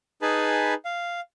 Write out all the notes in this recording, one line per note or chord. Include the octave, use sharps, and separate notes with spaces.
D#4 G#4 B4 G#5 A5 B5
F5